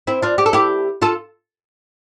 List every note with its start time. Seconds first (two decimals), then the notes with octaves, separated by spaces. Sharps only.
0.07 C4 E4
0.22 D4 F4
0.38 G4
0.46 A4
0.53 E4 G4
1.02 F4 A4